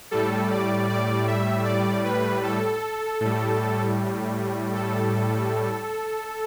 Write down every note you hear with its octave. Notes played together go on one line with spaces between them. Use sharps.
A2 G3 A4
D5
D5
E5
D5
B4
A4
A2 G3
A4